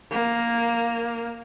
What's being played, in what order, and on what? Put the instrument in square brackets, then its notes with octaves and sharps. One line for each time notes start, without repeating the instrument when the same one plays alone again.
[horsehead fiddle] A#3